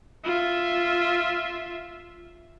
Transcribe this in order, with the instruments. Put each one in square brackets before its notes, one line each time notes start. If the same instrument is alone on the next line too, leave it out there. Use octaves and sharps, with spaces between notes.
[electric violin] F4 E5